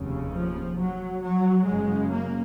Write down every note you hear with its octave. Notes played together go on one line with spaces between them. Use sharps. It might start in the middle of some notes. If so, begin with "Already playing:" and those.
Already playing: F1 D#2 C#3
F3
F#3
F#3
F#1 F#2 C#3 G#3
A#3